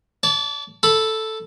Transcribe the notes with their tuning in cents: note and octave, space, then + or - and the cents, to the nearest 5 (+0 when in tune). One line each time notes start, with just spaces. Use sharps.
D5 -35 A5 -5
A4 +0 B5 +0